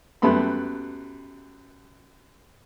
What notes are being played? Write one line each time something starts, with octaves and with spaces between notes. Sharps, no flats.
F#2 G3 A3 B3 B5 C6